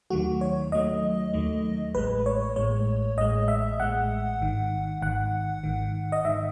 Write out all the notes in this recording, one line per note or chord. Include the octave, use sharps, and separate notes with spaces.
D#2 D#3 F#3 A3 F#4
C#5
D#2 D#3 F#3 A3 D#5
D#2 D#3 F#3 A3
A1 A2 G#3 B4
C#5
A1 A2 G#3 C#5
A1 A2 G#3 D#5
E5
A1 A2 G#3 F#5
G#1 G#2 D#3
G#1 G#2 D#3 F#5
G#1 G#2 D#3
D#5
G#2 D#3 E5